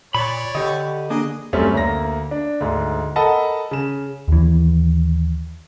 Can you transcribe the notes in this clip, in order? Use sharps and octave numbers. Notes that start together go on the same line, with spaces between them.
A#2 C#5 D5 B5
D3 G4 D#5
A#3 D4 G#4 D#5
F#2 G3 A3 C4 C#4
D2 A#3 A#6
D4
D2 G#2
A4 A#4 D#5 F#5 A5 B5
C#3 E7
D#2 E3